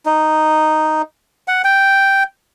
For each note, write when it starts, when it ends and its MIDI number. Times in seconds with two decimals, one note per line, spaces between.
0.06 1.02 63
1.48 1.62 78
1.64 2.23 79